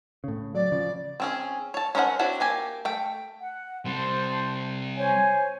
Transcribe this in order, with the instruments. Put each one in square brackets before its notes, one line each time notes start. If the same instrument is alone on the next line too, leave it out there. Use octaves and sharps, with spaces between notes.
[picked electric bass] A2 C#3
[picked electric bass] F#3 [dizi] D5
[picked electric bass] C#3 F3
[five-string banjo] C4 C#4 G#4
C#5 A5
C#4 A#4 C5 E5 F#5
C4 D4 E4 F#4 C#5
A#3 G4 G#5
A3 G5
[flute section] F#5
[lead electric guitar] C3 G3 [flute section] C5 A5 C6
[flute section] C5 C#5 G#5